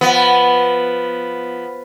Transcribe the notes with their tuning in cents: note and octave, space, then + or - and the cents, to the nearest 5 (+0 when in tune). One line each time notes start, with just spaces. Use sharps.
F3 +0 B3 +0